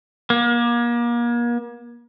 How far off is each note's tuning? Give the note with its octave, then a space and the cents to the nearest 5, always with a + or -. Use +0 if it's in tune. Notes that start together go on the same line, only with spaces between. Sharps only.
A#3 +35